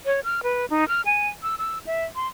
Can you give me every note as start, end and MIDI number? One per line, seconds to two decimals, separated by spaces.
0.06 0.20 73
0.24 0.41 89
0.43 0.66 71
0.70 0.87 63
0.88 1.01 89
1.05 1.28 80
1.43 1.55 88
1.59 1.79 88
1.87 2.04 76
2.16 2.27 84